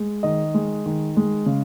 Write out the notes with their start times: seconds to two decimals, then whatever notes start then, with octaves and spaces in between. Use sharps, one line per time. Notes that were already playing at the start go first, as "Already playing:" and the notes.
Already playing: G#3
0.23 D#3 D#5
0.54 G#3
0.86 D#3
1.17 G#3
1.46 C#3